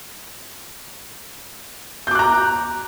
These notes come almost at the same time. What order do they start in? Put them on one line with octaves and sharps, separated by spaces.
G6 D6 F#6 A#5